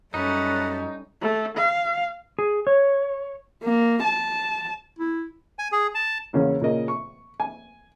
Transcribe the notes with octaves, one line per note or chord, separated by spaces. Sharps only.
F#2 G3 A3 C#4 D#4 B4 F#5 A#5
A3
F5
G#4
C#5
A#3
A5
E4
G#5
G#4
A5
E2 C#3 A#3 C#4
A#2 C#3 A#4 D#5
C#6
G#5